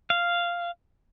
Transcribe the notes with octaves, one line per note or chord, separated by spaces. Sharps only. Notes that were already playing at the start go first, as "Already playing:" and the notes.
F5